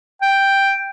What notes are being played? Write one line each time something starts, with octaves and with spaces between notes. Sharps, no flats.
G5